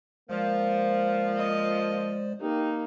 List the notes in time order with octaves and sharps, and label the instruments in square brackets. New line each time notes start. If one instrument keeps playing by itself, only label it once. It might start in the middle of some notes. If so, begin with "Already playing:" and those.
[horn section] F3 [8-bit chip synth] G#3 C5 D5 [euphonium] A#3
[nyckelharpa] D#5
[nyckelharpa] A#3 D#4 [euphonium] G4